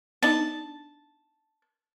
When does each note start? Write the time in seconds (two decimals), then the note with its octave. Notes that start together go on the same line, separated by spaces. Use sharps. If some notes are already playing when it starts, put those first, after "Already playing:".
0.23 B3 D4 D#4 A5